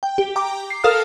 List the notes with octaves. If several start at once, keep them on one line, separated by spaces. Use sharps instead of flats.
G5
G4
G5 A#5 D6
C7
A4 A#4 F5 D#6 F6